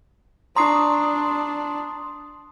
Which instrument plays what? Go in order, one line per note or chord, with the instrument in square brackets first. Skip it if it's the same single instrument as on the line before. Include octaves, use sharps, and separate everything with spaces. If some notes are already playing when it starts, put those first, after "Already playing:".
[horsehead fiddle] D4 [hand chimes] A#5 C#6 C7 [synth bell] C6 D#6